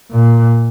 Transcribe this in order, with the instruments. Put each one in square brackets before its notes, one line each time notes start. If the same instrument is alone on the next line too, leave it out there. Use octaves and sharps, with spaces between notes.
[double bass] A#2